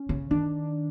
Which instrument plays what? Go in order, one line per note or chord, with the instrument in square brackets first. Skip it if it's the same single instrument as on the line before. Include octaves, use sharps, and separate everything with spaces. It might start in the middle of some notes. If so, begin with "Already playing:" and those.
Already playing: [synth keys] C#4
[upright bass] C#3
[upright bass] D#3 [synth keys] D4